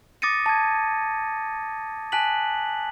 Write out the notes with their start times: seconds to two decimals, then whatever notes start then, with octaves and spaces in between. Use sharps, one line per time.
0.22 D6 D#6 A6 A#6 C#7 D#7
0.46 A5 G#6
2.12 G#5 A5 F#6 B6 F#7